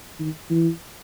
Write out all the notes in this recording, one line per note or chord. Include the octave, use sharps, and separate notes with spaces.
D#3
E3